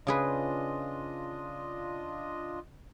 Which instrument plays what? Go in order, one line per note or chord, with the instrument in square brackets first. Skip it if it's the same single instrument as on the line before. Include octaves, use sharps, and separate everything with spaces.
[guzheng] C#3 G#4 B4 [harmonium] D4 F4 D#5